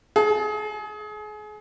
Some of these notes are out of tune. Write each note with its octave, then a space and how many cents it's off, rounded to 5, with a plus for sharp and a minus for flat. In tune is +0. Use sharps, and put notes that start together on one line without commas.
G#4 +30 A5 +0